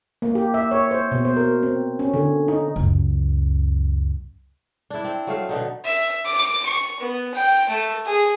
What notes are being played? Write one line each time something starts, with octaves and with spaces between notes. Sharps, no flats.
A#3
G4
E5
C#5
C5
B2
C5
A#4
C4
C#4
D3
D#4
C#2 F#2
D4 E4
C4
F#3 A3 F5
B2 D3 D#4
E5
D6
C#6
B3
G5
A3
G#4